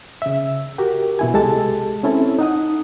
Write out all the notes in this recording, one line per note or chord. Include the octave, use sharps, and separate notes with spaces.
C#3 E5
F#4 G4 A#4
B2 E4 G#5
C2 G#3 G4 A4 A5
C4 C#4 E4 A4
D#4 F#5 D#6